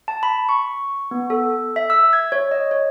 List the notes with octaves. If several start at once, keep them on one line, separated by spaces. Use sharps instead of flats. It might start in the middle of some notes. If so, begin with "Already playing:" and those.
A5
B5
C#6
B3
A4
E5
E6
G#6
C#5
D#5
C#5